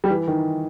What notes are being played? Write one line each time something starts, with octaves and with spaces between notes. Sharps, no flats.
G3
E3
D#3